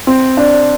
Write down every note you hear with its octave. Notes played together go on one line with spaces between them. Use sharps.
C4
D4